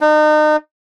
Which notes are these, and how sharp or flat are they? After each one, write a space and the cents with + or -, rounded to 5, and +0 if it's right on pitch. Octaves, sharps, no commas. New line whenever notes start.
D#4 -35